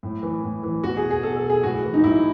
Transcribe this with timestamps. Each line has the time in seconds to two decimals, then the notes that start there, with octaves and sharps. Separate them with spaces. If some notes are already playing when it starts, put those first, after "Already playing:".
0.03 A2
0.23 E3
0.43 A2
0.63 E3
0.83 B2 F#4
0.97 G#4
1.11 G#4
1.23 B2 A4
1.37 A4
1.50 G#4
1.63 A2 F#4
1.83 E3
1.94 D#4
2.03 A2 E4